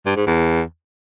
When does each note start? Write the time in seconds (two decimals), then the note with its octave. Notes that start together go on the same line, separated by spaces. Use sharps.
0.06 G2
0.16 G#2
0.27 E2